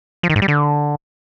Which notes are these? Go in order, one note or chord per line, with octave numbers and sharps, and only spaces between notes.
F3
D#3
G#2
G3
D3